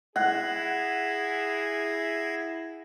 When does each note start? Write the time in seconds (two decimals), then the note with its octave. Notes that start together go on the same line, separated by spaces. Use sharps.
0.16 E4 G#4 F#5 G#6 A#6 C7